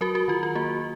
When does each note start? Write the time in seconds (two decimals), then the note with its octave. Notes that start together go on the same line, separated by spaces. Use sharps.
0.01 F#3 F#4 A#4
0.15 F#4
0.28 D#3 F4
0.43 F4
0.55 A#3 F#4